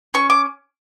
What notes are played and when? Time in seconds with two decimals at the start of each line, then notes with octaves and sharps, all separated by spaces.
0.14 C#4 C#6
0.30 D6